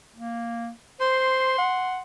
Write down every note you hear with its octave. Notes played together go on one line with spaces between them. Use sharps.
A#3
C5 C6
F#5